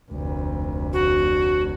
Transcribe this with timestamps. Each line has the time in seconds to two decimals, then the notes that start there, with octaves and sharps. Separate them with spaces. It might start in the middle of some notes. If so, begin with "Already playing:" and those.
0.11 F1 D2
0.93 F#4